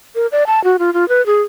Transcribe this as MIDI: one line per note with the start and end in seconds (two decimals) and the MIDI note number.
0.15 0.27 70
0.32 0.44 74
0.47 0.62 81
0.64 0.77 66
0.79 0.93 65
0.94 1.08 65
1.09 1.24 71
1.26 1.41 68